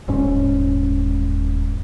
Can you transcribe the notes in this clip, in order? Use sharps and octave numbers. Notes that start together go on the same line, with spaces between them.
D#1 G#2 C#4